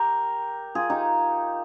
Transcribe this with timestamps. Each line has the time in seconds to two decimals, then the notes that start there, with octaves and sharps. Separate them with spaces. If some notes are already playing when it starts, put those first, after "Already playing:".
Already playing: G4 A#4
0.75 F4 G#4
0.90 D#4 G4